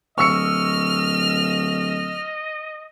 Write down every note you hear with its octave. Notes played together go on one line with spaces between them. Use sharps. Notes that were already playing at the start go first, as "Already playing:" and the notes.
D1 D#5 C#6 E6 F6 C#7